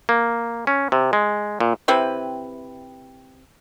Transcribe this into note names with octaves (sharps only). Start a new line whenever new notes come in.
A#3
C#4
C3
G#3
A#2
C3 C4 E4 B4